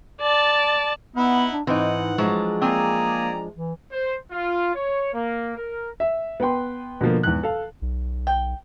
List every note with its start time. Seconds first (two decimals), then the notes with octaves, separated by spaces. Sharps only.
0.21 D5 A5
1.16 B3 D#4 E4 F#5
1.53 D4
1.67 G#2 E3 C4 D#4 F#5
2.18 F3 F#3 G#3 D4
2.62 A#3 C4 G#4 D5 G#5 A#5
3.57 E3
3.92 C5
4.31 F4
4.75 C#5
5.13 A#3
5.56 A#4
6.00 E5
6.40 B3 B4 G5 C6
7.01 B2 D3 F3 A#3
7.23 E2 G#2 F#6
7.43 A4 F5
7.82 B1
8.27 G5